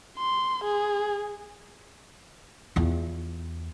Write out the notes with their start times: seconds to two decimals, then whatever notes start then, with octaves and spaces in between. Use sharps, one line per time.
0.18 C6
0.64 G#4
2.76 E2 F4